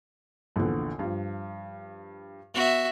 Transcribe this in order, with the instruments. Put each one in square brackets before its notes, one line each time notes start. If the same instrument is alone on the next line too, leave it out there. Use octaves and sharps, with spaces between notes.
[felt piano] A#1 E2 D3
G2 F3
[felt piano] B3 [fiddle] F#4 E5